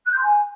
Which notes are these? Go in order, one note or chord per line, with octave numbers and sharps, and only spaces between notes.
F#6
G6
C6
G#5